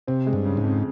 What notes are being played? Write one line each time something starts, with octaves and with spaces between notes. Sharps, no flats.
C3 C4
G#3
G2
C#3
G#2
F2